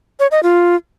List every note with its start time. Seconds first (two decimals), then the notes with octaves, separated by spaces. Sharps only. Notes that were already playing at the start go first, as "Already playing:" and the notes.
0.20 C#5
0.31 D#5
0.43 F4